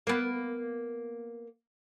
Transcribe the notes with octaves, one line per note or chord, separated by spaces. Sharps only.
A#3 B3